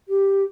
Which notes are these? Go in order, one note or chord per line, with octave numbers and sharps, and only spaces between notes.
G4